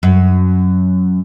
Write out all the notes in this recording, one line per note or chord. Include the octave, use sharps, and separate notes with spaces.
F#2